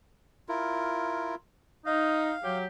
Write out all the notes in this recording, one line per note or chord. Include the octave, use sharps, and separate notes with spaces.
E4 F4 A#4
D#4 F5
F#3 G4